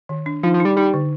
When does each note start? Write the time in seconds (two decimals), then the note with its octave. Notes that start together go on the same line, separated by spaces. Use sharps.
0.09 D#3
0.26 D4
0.43 F3 D#4
0.54 F3
0.60 G3 D#4
0.77 G3 D#4
0.94 D3